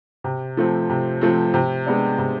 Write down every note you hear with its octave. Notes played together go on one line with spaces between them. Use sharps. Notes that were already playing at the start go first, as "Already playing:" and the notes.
C3
F3 A3 C4
C3
F3 A3 C4
C3
G#3 B3 D4
C3